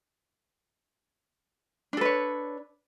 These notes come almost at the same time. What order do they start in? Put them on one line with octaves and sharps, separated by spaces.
D4 A4 B4 C#5